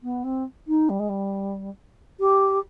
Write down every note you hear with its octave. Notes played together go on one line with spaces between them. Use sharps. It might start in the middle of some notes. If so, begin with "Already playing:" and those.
B3
C4
D#4
G3
G#3
G3
G4